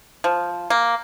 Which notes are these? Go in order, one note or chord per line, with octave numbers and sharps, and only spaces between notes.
F3
A#3